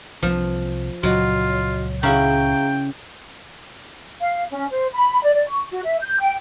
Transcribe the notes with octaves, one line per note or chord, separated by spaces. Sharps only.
C2 C3 F3 A#3
C#2 A#2 F#3 F4 F#4 D#5
C#3 E4 F#4 G#4 F5 G5 A#5
F5
C#4
C5
B5
D5
D5
C#6
F#4
E5
G6
G5